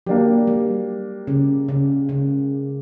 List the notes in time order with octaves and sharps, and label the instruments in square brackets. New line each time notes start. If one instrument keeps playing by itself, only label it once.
[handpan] F#3 [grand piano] A#3 D4 G4
[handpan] G3
C#3
C#3
C#3